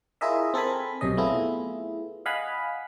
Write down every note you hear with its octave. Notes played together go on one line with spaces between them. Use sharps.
E4 F4 G#4 A#4 D#5 E5
C4 A4 A#4 G#5 B5
B1 F#2 C3 C#4 D#5
A3 B3 E4 F4 G#4
D#5 F5 F#5 G#5 B5